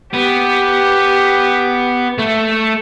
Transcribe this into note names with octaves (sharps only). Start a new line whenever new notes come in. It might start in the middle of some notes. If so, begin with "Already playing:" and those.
B3 G4
A3